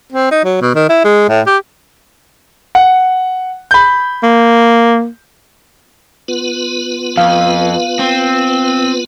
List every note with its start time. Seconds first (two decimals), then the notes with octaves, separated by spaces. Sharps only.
0.12 C4
0.31 D#4
0.44 F#3
0.61 B2
0.74 D#3
0.89 E4
1.04 G#3
1.29 A2
1.47 G4
2.75 F#5
3.71 B5 G6
4.23 A#3
6.28 B3 F4 B4
7.18 F2 F5
7.99 C4